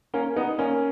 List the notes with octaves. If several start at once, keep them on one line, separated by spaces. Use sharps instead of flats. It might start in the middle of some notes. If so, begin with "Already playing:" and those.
A#3 C#4
B3 D#4
A#3 C#4